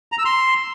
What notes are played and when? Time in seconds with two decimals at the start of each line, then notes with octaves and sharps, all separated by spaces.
0.12 A#5
0.19 E6
0.25 C6